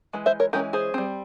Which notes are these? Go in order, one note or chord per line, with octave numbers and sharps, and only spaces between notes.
E3 G#3
C5 E5
A#4 C#5
E3 G#3 C#4 G4 A#4
G#4 C5
G3 C4